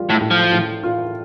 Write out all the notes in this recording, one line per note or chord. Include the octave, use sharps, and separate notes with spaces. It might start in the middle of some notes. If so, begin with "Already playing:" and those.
Already playing: G3 F4
A2
A2
F3
A2
F4